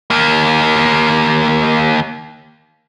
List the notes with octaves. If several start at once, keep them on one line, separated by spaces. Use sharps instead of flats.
D#2 A#3